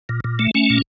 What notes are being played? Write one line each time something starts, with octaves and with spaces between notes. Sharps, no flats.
A#2
A#2
A3
A3 C#4
A#2